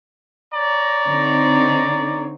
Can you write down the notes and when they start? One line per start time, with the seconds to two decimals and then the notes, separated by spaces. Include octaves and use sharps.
0.54 C#5 D5 A#5
1.07 D3 C4 D#4